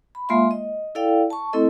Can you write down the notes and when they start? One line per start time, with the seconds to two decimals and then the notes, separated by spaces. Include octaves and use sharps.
0.15 B5
0.29 G#3 A#3 F4 E5 F5 C6
0.51 D#5
0.95 E4 A4 D5 F5 G5
1.30 A5 C#6
1.53 A3 C4 E4 A4 D#5